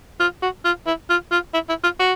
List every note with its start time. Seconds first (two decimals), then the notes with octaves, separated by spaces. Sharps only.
0.20 F4
0.42 F#4
0.65 F4
0.86 E4
1.10 F4
1.31 F4
1.54 E4
1.69 E4
1.84 F4
2.00 F#4